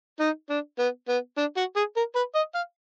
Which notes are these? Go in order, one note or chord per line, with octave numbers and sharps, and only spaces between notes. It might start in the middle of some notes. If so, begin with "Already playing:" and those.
D#4
D4
B3
B3
D4
F#4
G#4
A#4
B4
D#5
F5